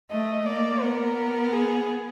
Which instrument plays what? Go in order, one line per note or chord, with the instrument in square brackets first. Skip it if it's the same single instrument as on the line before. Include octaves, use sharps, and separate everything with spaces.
[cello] A3 [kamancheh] D#5
[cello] A#3 [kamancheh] D5
[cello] B3 [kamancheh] A#4
[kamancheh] G#4